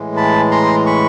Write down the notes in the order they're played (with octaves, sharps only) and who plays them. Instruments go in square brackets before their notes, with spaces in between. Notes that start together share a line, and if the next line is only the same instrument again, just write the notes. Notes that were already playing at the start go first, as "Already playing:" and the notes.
Already playing: [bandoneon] A2 E3 G#3
A5 B5
A#5 C6
B5 C#6